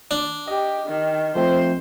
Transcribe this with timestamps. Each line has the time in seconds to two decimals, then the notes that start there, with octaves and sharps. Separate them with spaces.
0.11 D4
0.48 G4 D#5
0.87 D#3
1.35 F3 A3 C4 C5